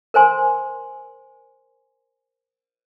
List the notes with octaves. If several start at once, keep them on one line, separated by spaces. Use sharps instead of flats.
A#4 C5 G#5 C6